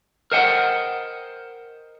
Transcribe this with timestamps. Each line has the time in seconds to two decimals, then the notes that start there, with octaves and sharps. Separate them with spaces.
0.32 A#4 C5 D#5 F#5 G5